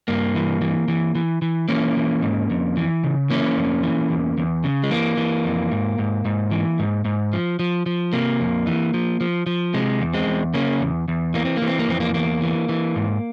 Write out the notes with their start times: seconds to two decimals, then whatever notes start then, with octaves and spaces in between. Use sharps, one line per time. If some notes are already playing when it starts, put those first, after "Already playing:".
0.08 G2 A#3
0.35 E3
0.61 E3
0.88 E3
1.15 E3
1.42 E3
1.69 E3 A#3 C#4
1.97 E3
2.22 G#2
2.50 F2
2.77 E3
3.04 C#3
3.30 E3 A#3 C#4
3.57 F2
3.83 E3
4.10 E2
4.38 E2
4.64 C#3
4.83 G#3
4.90 E3 A#3
5.17 E3
5.45 F2
5.72 G#2
5.99 G#2
6.25 G#2
6.51 E3
6.79 G#2
7.05 G#2
7.33 F3
7.59 F3
7.86 F3
8.13 C3 A#3
8.40 F2
8.67 E3
8.94 F3
9.21 F3
9.47 F3
9.74 C3 G#3
10.01 E2
10.14 G#3 C4
10.27 E2
10.54 C#3 A#3 C#4
10.81 E2
11.08 E2
11.34 E3 A#3
11.45 C4
11.57 E3 A#3
11.67 C4
11.79 A#3
11.88 F2 C4
12.00 A#3
12.14 E2 A#3
12.42 E3
12.69 E3
12.96 G#2